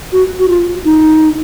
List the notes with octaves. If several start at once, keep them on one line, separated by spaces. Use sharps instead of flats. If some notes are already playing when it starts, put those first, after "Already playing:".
F#4
F#4
F4
D#4